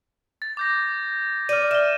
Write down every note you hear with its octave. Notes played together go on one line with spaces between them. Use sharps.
A6
D6 G6 A#6
D5 F6 D#7
E5 E7 G7